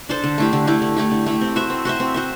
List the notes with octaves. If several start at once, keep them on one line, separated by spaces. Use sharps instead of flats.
D4 A4 C5
D3
A3 E4 G4
D3
A3 E4 G4
D3
A3 E4 G4
D3
A3 E4 G4
C4
F#4 C5 E5
C4
F#4 C5 E5
C4
F#4 C5 E5